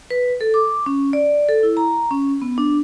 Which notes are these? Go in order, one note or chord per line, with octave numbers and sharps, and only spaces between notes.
B4
A4
D6
C#4
D5
A4
E4
A#5
C#4
B3
D4